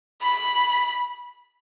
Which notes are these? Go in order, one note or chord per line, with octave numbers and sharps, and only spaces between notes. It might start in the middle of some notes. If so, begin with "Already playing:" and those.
B5